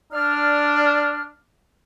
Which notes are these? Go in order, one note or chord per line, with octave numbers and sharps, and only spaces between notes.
D4 D5 F6